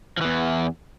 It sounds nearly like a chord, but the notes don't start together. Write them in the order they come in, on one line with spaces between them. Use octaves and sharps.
F3 E3 E2